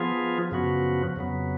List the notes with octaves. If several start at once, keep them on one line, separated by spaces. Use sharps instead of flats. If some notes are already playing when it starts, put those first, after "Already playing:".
Already playing: F3 B3 F4 G#4
F#2 C#3 F3 B3 F#4
F2 C#3 F#3 B3